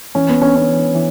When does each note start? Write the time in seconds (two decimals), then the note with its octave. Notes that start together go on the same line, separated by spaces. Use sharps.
0.15 E3 C#4
0.29 B3
0.42 C#4 D4
0.55 C#4
0.68 E3
0.95 E3